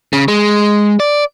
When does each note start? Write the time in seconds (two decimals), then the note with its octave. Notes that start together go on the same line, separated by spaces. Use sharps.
0.13 C#3
0.28 G#3
1.00 D5